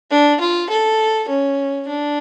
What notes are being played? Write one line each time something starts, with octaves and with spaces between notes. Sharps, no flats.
D4
F4
A4
C#4
D4